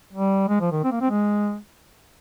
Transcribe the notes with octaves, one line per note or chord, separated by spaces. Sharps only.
G3
G#3
F3
D#3
C4
A#3
C4
G#3